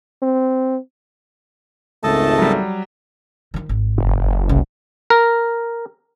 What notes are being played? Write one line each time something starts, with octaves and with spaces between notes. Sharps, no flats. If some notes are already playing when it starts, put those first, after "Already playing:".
C4
G#1 C#2 A3 A4 D#5 A5
F#3 G3
D#3 F3
G#1
F#1
C2 C#4
A#4